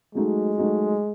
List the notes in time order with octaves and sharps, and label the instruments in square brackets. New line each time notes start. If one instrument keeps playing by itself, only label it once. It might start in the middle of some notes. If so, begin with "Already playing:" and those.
[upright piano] F#3 A3 D#4 F#4 [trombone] G#3
[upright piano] F#3 A3 D#4 F#4